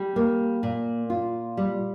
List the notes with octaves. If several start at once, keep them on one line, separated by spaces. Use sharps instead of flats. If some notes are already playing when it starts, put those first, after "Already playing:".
Already playing: G3
A#3
A#2
F4
G3